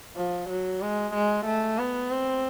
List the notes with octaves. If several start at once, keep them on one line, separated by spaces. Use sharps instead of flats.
F3
F#3
G#3
G#3
A3
B3
C4